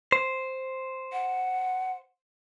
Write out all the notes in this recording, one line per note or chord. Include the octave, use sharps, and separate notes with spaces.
C5
F#5